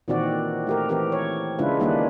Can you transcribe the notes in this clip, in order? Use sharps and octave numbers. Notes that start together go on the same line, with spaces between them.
A#2 D#3 E3 C4 F#4 D5
A3 G4 A#4
E3 C4 G4 A#4
C#5
C#3 G#3 D4 E4 F4 B4
D#3 G3 A#3 C#4 D4 B4